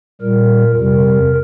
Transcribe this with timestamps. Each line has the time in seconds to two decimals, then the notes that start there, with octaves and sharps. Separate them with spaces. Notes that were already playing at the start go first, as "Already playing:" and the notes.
0.21 A#2 G3 A#4
0.75 F2 C3 G3 A#4